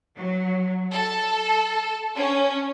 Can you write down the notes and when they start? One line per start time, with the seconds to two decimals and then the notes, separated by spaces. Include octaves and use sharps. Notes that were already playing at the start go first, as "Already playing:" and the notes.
0.16 F#3
0.93 A4
2.16 C#4